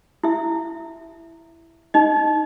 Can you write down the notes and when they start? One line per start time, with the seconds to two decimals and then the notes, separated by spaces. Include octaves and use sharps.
0.23 E4 E5
1.94 D#4 D#5